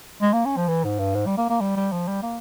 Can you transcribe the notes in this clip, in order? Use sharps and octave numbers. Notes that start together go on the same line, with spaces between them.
G#3
A#3
C#4
F3
E3
G#2
G2
G#2
G3
A#3
A#3
G3
G3
F3
G3
A#3